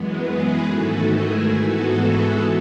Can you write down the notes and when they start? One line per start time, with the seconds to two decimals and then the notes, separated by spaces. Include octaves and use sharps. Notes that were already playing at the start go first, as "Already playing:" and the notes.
Already playing: F#2 E3 G#3 B3
0.24 G#4 B4
0.68 G#2 D#3 A3 F#4 A4
1.12 E4 G#4
1.56 G#2 E3 G#3 B3 F#4 A4